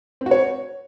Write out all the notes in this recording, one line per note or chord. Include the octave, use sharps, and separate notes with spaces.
C4
F#4
C#5